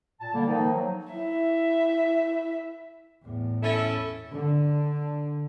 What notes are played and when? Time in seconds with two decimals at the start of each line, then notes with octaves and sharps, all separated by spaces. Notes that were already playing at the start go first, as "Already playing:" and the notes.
0.20 A#2 A5
0.34 D3 G3 A#3
0.46 D#3 F3 A#3 D#4
0.73 F#3
1.13 E4 E5
3.23 E2 A2
3.63 C#4 E4 A4
4.31 D3